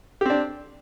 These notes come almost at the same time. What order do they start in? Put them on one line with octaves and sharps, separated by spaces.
G4 C4 D4